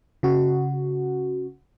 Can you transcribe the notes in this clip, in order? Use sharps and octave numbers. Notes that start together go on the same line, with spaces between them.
C#3 F#4